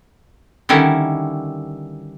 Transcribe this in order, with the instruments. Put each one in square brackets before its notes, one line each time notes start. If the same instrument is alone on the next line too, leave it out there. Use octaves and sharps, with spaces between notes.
[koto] D3 D#3 G3 C#4 E4